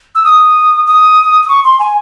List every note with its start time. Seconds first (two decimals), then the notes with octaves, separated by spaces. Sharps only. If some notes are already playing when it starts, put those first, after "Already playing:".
0.15 E6
0.24 D#6
0.87 D#6
1.43 D#6
1.48 C#6
1.64 C6
1.79 G#5